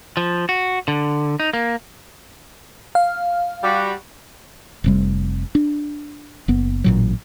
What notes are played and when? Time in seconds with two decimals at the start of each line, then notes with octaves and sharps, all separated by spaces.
0.17 F3
0.49 F#4
0.88 D3
1.40 D#4
1.53 A#3
2.95 F5
3.63 G3 F#4
4.84 F1 C3 G3
5.55 D4
6.48 F#1 B3
6.84 A1 A#2 F#3